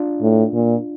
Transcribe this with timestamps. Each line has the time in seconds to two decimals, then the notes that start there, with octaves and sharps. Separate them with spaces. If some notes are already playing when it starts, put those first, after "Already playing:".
Already playing: D4 F4
0.22 A2
0.53 A#2